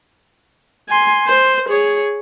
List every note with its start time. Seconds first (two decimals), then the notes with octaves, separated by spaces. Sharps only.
0.89 G#5 C6
1.27 C5
1.69 G#4 C#5